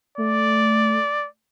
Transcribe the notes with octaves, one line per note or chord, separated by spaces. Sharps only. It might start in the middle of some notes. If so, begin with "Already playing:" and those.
A3 D5